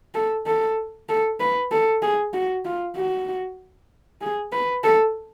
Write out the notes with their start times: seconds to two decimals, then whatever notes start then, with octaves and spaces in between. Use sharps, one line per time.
0.15 A4
0.46 A4
1.09 A4
1.40 B4
1.71 A4
2.02 G#4
2.33 F#4
2.65 F4
2.96 F#4
4.21 G#4
4.52 B4
4.84 A4